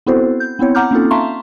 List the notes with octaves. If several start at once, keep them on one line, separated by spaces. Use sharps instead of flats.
B3 C4 E4 F#4 A4 C5
G6
B3 C4 E4 C#5
F#5 A#5 D6 F6 G6
A#3 C4 C#4 D#4 F4 A4
E5 F5 A5 A#5 C6 C#6